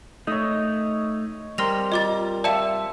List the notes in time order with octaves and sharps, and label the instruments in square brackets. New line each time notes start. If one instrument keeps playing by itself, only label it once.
[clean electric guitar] A3 D#4 [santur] C#5 D#5
[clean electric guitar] G3 C6 [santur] C4 A#4 [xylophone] F6 A#6 F7
[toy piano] F4 [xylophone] D#5 D6 A6
[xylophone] D5 G5 E7 [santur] E5 [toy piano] F5 A5